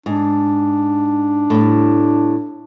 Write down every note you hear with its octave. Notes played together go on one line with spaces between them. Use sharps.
G#2 D4
A2 G3